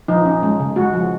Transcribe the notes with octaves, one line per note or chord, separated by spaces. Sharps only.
F3 D#4
C#4
G#3
C#3
G#3 F#4
F3